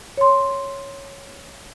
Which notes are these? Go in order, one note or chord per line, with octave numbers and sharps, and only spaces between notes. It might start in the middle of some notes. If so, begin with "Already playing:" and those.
C#5 C6